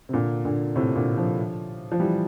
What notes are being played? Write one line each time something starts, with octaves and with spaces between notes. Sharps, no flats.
C3
A#2 D3
A#2 D3
A2 C3
A#2 D3
D3 F3
F3
E3 G3